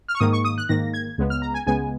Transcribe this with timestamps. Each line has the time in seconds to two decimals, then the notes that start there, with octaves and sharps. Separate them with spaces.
0.08 F6
0.15 C#6
0.20 G#2 D#3 A#3 D#6
0.33 C#6
0.45 D#6
0.58 F#6
0.69 G#2 D#3 A#3 A#6
0.94 G#6
1.18 C#2 C#3 G#3 B3
1.30 F6
1.42 A#5
1.54 G#5
1.67 C#2 C#3 G#3 B3 G#5